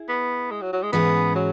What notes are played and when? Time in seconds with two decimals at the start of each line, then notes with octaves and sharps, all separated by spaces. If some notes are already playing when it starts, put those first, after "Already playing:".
Already playing: E4 G#4
0.09 B3
0.51 G#3
0.62 F#3
0.73 F#3
0.83 G#3
0.93 G#2 E3 B3 C#4 G#4 B4
1.35 F#3